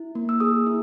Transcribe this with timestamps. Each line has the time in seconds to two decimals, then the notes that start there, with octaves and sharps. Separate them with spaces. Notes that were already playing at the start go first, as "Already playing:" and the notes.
Already playing: E4
0.15 A#3
0.29 E6
0.40 G#4 D#6
0.67 E4